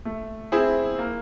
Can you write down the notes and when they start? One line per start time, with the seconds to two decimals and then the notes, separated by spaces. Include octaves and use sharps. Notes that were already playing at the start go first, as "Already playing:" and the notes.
0.05 A3
0.52 C4 E4 G#4 C5
0.98 A#3